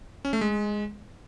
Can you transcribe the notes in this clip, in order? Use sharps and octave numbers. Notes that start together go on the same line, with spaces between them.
C#4
A3
G#3